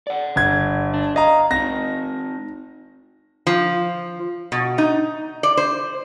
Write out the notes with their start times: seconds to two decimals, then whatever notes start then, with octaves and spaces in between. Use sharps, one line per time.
0.07 D5 F#5
0.36 G1 G#6
0.94 D4
1.16 D#5 F5 A#5
1.51 C4 D#4 A#6
3.47 F3
4.52 B2
4.78 D#4
5.43 D5
5.57 C5